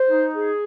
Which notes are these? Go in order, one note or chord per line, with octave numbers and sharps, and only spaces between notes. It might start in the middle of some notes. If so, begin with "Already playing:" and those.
Already playing: C5
D#4
G#4